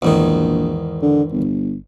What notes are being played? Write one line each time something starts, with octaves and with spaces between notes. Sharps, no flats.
A#1 E2 G#2 D#3
D3
G1